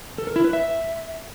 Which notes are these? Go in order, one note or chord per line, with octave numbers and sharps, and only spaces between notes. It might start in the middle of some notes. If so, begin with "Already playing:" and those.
A4
A#4
E4
B4
E5